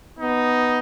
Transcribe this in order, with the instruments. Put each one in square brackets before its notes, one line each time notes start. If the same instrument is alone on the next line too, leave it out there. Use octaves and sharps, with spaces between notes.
[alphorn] B3 [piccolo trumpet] D#4